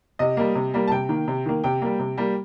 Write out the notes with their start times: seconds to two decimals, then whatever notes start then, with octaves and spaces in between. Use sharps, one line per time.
0.19 C3 D#5
0.37 G3 A#3
0.55 C3
0.74 G3 A#3
0.88 A5
0.91 C3 G5
1.09 D#3 A#3
1.28 C3
1.46 D#3 A#3
1.64 C3 G5
1.82 G3 A#3
1.99 C3
2.18 G3 A#3